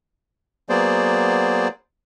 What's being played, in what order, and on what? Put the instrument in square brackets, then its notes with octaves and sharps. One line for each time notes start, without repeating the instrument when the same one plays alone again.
[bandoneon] F#3 A#3 B3 G#4 C5 D5